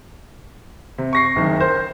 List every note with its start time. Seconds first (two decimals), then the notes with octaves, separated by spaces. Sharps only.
0.98 C3
1.13 C#6 A#6 C7
1.36 F#1 D#3
1.60 A#4 C5